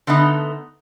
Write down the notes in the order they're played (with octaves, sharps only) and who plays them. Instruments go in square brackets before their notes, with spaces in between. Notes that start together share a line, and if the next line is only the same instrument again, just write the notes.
[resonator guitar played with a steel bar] D3 A3 B3 D#4